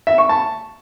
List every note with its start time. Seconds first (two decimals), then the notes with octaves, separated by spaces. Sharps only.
0.07 E5
0.18 C#6
0.29 A5